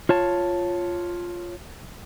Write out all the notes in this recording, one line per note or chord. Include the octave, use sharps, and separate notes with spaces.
F4 C#5 A5